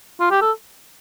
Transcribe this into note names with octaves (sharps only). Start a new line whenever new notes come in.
F4
G4
A4